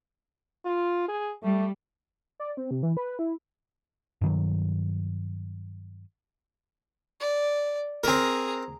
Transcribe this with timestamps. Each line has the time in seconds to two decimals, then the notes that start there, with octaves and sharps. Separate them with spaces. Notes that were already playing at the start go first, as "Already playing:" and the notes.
0.65 F4
1.09 G#4
1.43 G3 A3
2.40 D5
2.57 C4
2.71 C3
2.83 E3
2.97 B4
3.19 E4
4.21 G2 D#3 F#3
7.20 D5
8.04 C4 G#4 A#4 A#5